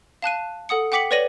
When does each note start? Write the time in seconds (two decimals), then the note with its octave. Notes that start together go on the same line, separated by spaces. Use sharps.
0.22 F5 A5 F#6 D#7
0.69 A4 F#5 D#6 C#7
0.92 F#5 G5 D6 B6 C#7 F#7
1.11 B4 C#5 D5 A#6 D#7 F#7